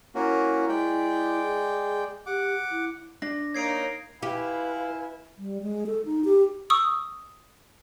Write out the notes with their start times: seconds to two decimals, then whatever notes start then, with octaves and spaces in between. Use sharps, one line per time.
0.15 A#3 C#4 E4 F#4
0.69 G#3 D5 G5
1.43 G#4
2.26 G4 F#5 D6
2.70 E4
3.22 D4 A#6
3.54 A#3 D#4 C#5 G#6 C7 D7
4.23 E4 F4 G4 B4 F5 G#5
5.38 G3
5.62 G#3
5.87 A4
6.05 D#4
6.25 G4
6.70 C#6 D#6 E6